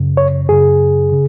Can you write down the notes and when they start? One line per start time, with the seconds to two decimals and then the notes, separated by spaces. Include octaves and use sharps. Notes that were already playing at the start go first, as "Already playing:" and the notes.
Already playing: F#2 C#3
0.17 C#5
0.49 F#2 C#3 G#4
1.12 C#3